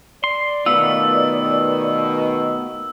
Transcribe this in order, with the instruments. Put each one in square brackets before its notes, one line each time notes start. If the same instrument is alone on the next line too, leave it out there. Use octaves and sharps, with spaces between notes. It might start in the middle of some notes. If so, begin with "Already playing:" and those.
[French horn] D5 [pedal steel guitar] C6
[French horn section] B2 D#3 [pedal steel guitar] A3 B3 F4 [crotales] E6